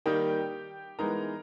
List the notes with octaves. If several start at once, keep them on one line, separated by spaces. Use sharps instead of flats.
D#3 G3 A#3 D#4 G4 G5
E3 G#3 B3 D#4 A#4 A#5